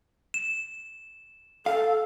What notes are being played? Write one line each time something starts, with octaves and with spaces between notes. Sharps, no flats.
E7
A4 F5